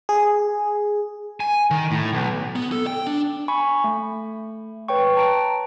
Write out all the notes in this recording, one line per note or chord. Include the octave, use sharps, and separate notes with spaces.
G#4
G#5
D#3
A2
B1
B3
A4
G5
D4
G#5 B5 C#6
A3
B4 C#5 G5 C#6
A5 A#5 D7